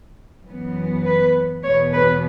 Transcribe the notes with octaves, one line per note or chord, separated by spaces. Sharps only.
F#2 E3 B3
B4
E2 B2 B3 C#5
B4